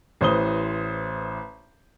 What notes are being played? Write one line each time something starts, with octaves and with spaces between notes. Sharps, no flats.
A1 E3 C5 D#6 G7